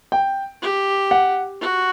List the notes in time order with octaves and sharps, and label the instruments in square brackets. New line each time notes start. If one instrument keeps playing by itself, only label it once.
[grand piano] G5
[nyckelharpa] G4
[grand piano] F#5
[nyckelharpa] F#4